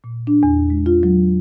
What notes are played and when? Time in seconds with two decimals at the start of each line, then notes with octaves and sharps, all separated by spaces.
0.04 A#2
0.27 D4
0.43 E2
0.70 G#3
0.86 F4
1.03 F#3